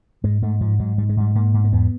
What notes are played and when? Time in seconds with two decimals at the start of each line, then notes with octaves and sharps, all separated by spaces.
0.24 G#2 G#3
0.42 G#2 A3
0.61 G#2 F3
0.79 G#2 F#3
0.98 G#2 G3
1.09 G#3
1.17 G#2 G3
1.35 G#2 A#3
1.54 G#2
1.64 A#3
1.72 E2 B3